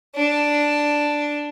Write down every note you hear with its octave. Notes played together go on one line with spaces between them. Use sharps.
D4